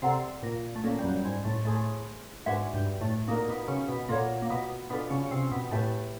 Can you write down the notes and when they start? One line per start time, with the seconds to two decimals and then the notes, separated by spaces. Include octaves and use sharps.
0.02 C3 C4 A4 D5 F#5 A#5
0.43 A#2 A#3
0.76 A3
0.83 A#2 A#3 C#4 E4 A4
0.99 G3
1.04 F#2 F#3
1.14 G3
1.24 G#2 G#3
1.45 A2 A3
1.65 A2 A3 E4 G#4 C5
2.46 G#2 G#3 D4 F#4 B4 E5
2.74 G2 G3
3.01 A2 A3
3.28 A#2 A#3 D#4 F#4 A#4
3.48 B2 B3
3.68 C#3 C#4
3.88 B2 B3
4.09 A#2 A#3 F4 A4 C#5 F#5
4.42 A#3
4.50 B2 B3
4.90 B2 B3 D4 F4 A4
5.10 C#3 C#4
5.26 C#4
5.31 C3 C4
5.52 B2 B3
5.71 A2 A3 E4 G4 B4 E5